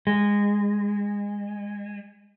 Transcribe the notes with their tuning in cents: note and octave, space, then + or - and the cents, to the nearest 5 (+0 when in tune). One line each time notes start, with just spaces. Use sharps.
G#3 -20